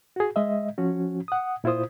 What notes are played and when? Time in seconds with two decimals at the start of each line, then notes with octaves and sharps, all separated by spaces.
0.16 F#4 G#4
0.36 G#3 D#5 E5
0.78 F3 C#4 F#4
1.28 F#5 D#6
1.64 A#2 E4 F4 C5 D#6